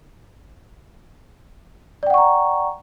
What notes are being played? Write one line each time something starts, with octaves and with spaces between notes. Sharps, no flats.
D5 F#5 G5 A#5 C#6